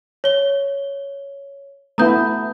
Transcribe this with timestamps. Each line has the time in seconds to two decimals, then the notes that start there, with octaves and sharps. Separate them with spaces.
0.24 C#5 G7
1.98 A3 B3 E4 A#5 D#6 G6